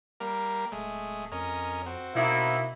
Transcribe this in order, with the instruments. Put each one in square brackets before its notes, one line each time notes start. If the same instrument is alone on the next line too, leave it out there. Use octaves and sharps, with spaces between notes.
[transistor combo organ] G3 A#3 A#4
[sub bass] D1 [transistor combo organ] G#3 A3
[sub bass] F2 [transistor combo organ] C#4 A#4 D#5
[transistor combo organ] C4 F#4
[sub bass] B2 [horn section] A#3 D#4 E4